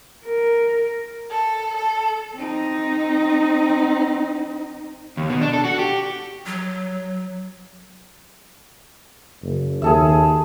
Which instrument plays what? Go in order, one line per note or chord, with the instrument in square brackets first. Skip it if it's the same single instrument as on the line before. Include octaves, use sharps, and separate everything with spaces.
[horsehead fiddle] A#4
[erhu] A4
A4
[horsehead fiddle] C4 D#4
[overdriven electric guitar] D#2
B2
D4
A4
F#4
G4
[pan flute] F#3
[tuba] F#1
[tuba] D#2 [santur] G#4 A4 E5